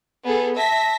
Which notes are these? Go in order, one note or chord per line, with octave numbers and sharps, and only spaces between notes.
B3 G#4 A4
E5 A5 A#6 B6